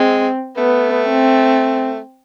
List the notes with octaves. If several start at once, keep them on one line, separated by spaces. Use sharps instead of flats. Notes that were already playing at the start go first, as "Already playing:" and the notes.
Already playing: G#3 C4
A3 B3
C4